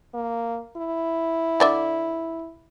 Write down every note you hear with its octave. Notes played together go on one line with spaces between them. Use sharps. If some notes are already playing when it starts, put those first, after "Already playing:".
A#3
E4
D3 D5 E5